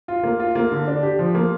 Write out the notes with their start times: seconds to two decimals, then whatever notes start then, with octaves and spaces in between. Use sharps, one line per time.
0.08 F4
0.23 A#3
0.40 F4
0.55 A#3
0.72 D3
0.87 D4
1.03 G4
1.19 F3
1.35 A#3